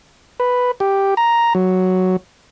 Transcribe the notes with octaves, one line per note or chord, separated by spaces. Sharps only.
B4
G4
A#5
F#3